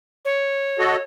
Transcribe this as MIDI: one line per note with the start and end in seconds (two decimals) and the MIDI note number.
0.25 1.02 73
0.79 0.96 66
0.79 0.96 69
0.79 0.96 75